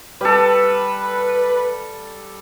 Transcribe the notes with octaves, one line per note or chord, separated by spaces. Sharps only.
G3 A4 B4